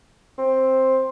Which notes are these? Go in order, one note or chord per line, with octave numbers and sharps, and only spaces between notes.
C4